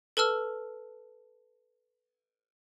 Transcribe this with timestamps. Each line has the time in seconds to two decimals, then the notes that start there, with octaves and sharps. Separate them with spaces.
0.17 A4 B4 A5 E6 F6